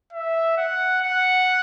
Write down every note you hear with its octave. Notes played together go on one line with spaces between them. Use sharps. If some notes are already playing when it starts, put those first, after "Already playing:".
E5
F#5
F#5